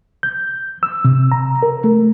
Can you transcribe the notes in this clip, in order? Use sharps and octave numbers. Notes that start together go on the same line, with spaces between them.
G6
E6
C3
A#5
A#4
A3